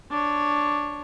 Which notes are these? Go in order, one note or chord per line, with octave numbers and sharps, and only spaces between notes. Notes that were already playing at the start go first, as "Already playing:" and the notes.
D4 C#5